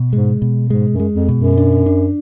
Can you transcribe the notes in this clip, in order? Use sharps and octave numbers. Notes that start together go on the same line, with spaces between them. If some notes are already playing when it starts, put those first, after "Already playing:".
Already playing: B2
G#2 G#3
B2
G#2 G#3
F#2
G#3
F2
B2
F#2
D4
D4